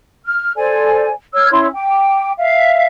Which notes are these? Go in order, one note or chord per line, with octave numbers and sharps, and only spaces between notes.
F6
A4 C5 D5 G#5
C#5 E6 F6 G#6
C#4 E4 C#5 C6
G5 D6
E5 F5